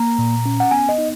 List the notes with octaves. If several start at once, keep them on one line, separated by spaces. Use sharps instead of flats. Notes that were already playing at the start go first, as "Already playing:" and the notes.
Already playing: A#3 A#5
A#2
C#4
F#5
B3 G#5
D#5
D#4